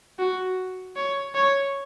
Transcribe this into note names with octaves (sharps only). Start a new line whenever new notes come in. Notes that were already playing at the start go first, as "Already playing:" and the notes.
F#4
C#5
C#5